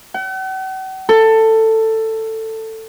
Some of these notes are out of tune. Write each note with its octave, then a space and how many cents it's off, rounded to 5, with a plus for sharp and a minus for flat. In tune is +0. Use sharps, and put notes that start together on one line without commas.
F#5 +45
A4 +15